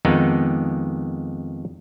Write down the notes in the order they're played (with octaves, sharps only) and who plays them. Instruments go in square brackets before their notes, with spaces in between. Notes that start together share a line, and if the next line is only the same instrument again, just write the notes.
[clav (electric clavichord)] F2 D#3 G#3 B3 D#4